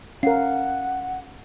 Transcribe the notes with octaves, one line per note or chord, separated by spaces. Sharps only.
C#4 A#4 F5 F#5